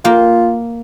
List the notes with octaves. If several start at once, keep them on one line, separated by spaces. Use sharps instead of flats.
A#3 F4 G5